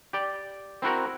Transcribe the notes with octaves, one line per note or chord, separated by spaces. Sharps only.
G4 D5 G5
C4 E4 F#4 A#4